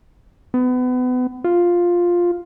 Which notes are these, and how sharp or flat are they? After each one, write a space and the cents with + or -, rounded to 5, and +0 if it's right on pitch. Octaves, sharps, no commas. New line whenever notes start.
B3 +30
F4 +5